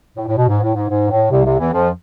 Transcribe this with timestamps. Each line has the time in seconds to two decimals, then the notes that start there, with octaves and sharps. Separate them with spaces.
0.17 A2
0.27 A2
0.37 B2
0.48 G#2
0.61 A2
0.75 G#2
0.89 G#2
1.10 A2
1.30 C2 C3
1.44 C2 C3
1.58 E2 E3
1.72 F2 F3